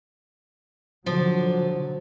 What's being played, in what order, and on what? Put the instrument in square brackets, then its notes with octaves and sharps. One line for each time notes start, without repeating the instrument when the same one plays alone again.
[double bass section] D3 F#3 [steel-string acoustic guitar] F3